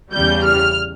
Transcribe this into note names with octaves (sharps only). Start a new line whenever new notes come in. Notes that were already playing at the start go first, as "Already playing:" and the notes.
E2 C#3 G3 G6
F6